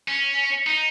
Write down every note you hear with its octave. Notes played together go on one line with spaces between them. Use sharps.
C#4
D#4